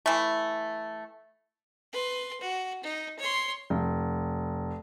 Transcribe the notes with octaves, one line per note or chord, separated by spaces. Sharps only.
E3 A3
B4 C6
F#4
D#4
C#5 C6
F1